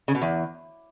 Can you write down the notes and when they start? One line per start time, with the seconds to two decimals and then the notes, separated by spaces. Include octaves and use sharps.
0.08 C#3
0.15 B2
0.22 E2